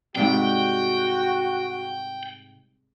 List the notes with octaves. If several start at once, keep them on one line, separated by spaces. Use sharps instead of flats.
G#2 C3 G3 G#3 C4 F#4 G5